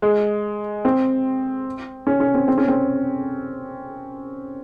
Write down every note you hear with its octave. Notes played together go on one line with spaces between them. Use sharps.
G#3
C4
C#4
C#4
C4
C4
C#4
C4